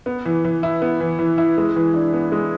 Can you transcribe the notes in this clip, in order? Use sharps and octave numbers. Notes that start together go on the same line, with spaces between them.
B3
E3
E3
E4
B3
E3
E3
E4
G#3
E3
D4
B3
G#3